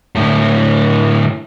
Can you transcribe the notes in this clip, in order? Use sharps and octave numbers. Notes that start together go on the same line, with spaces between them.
A2 D3